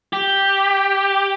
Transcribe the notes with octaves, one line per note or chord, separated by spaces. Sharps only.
G4